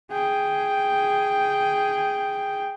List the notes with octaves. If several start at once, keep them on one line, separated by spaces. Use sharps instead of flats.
G#4 G5